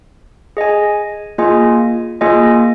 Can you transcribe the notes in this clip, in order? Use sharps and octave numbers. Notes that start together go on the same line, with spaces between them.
G#4 D#5 G#5
A#3 F4 G#4 D#5 G#5
A#3 F4 G#4 D#5 G#5